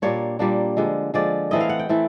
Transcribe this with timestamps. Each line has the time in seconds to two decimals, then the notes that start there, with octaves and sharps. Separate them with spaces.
0.02 A#2 G3 A#3 D4 C#5
0.39 A#2 G3 A#3 D4
0.77 D3 F3 G#3
1.14 D3 F3 G#3 D5
1.51 E3 A3 C4 E4 D#5
1.60 F5
1.69 F#5
1.79 G5
1.89 E3 A3 C4 E4